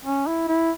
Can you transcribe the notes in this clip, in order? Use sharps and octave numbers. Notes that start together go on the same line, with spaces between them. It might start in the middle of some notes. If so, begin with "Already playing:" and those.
C#4
E4
E4